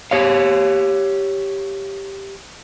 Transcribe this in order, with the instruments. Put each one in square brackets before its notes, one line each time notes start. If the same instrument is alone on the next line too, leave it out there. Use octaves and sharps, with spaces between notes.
[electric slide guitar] G4 C#5 F5